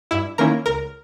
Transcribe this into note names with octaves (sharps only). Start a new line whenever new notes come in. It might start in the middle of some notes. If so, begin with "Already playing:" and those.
G2 E4 E5
D#3 A#3 C#4 E4 A#4 A#5
C#2 A#4 A#5